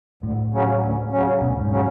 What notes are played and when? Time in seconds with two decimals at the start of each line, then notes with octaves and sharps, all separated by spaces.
0.23 D2 A2
0.52 C#3 F#3 C#4
0.82 D2
1.12 C#3 F#3 C#4
1.42 D2 B2
1.57 A2
1.60 G#2
1.71 C#3 F#3 C#4